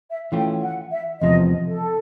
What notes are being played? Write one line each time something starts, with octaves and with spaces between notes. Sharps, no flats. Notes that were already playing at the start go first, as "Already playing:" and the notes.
E5
E3 A3 C#4 F4 G5
F#5
E5
E2 C3 F3 D#5
A4